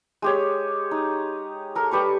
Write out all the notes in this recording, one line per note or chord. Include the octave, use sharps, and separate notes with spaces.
G#3 G4 C#5
D#4
A4 A#4
G3 G4 B4 C#6